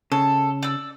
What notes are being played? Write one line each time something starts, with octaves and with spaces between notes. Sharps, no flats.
C#3 A4
D5 E6